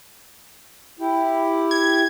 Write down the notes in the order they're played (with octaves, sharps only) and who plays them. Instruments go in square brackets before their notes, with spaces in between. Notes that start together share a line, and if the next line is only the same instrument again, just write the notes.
[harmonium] E4 G4
[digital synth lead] G#6